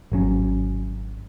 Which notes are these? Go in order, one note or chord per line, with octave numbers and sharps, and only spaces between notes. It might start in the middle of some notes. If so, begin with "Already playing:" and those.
G#1 F#3 C#4